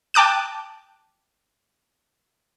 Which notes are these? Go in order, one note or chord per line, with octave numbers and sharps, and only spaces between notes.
G5 A5 D6 F#6 D#7